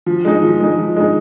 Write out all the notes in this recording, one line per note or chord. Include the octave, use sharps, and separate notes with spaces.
F3
G#3 D#4
F3
G#3 D#4
F3
G#3 D#4